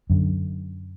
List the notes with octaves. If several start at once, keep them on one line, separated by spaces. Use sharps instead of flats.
F#2 D3